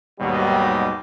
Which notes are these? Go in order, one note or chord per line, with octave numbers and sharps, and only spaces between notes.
D#2 G#2 B2 D#3 F#3 G3